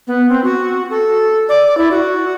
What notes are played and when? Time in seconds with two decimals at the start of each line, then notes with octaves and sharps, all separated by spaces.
0.07 B3
0.29 C4
0.44 F#4
0.90 A4
1.49 D5
1.77 E4
1.91 F#4